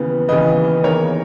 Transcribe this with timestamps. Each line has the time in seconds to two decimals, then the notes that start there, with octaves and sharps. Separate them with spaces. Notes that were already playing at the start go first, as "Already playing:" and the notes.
Already playing: D#2 C#3 E3 B3
0.28 D#2 C#3 E3 B3 B4 D#5
0.84 E2 D#3 A#3 A#4 C#5